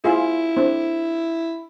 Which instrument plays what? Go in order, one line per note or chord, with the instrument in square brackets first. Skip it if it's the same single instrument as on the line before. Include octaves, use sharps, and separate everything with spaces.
[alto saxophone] E4 [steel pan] F4 G#4
[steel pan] C4 D4